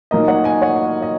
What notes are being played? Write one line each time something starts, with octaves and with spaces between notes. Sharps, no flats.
A#2 F#3 D#4 A#4 D#5
C#5 F#5
D#5 G#5
C#5 F#5
D#5